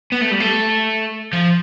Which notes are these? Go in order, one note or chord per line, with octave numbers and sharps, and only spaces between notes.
B3
A3
G3
A3
F3